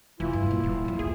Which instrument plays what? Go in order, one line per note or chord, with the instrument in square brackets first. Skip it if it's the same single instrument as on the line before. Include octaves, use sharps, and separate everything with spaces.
[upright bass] F1 [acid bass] E3 [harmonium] E4 F4
[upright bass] G2 F#3
A#2 A3
[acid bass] E1 [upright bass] G3
[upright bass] F2 A#2
[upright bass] A#1 D#2 [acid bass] G#4